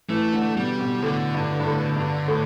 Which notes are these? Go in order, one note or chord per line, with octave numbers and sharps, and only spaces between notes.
E3 A3
D3
B2 G3
B2
A2 D3
G2
G2
A2
G2
A2